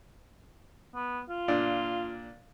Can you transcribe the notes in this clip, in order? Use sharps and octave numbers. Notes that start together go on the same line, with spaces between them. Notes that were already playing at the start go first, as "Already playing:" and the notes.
B3
F4
A#2 D4